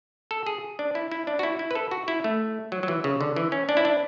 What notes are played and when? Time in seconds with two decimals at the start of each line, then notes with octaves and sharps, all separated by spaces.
0.31 A4
0.46 G#4
0.79 D4
0.95 E4
1.12 E4
1.27 D4
1.39 F#4
1.43 E4
1.59 E4
1.71 B4
1.75 A4
1.91 F#4
2.08 E4
2.24 A3
2.72 F#3
2.83 F#3
2.88 E3
3.04 C#3
3.21 D3
3.36 E3
3.52 C#4
3.69 D4
3.77 E4
3.85 D4